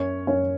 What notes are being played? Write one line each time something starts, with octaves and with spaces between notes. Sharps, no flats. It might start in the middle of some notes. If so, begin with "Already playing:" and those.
Already playing: F#2 C#4 C#5
F#2 C#4 C#5